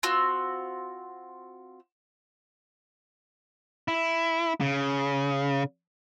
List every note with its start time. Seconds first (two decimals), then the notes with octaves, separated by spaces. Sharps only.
0.03 C4 F4 F#4
3.88 E4
4.60 C#3